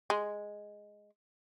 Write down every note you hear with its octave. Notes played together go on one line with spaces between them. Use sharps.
G#3